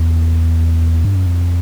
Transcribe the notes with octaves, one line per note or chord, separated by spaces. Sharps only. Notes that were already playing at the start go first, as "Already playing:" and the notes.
Already playing: E2
G2
F#2
F2